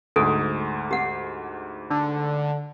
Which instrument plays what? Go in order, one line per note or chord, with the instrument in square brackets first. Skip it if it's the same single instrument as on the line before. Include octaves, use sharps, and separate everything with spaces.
[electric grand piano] D2 G#2 [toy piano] A4
[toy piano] G4 F#5
[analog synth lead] D3